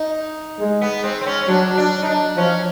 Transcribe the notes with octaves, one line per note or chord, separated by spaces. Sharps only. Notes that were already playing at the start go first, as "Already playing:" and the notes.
Already playing: D#4
G#3
B3
C4
C4
C#4
C#4
F#3 D4
D4
D#4
D4
F3 C#4